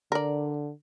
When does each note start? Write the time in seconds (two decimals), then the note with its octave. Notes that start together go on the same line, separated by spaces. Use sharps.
0.12 D3 A#4 D5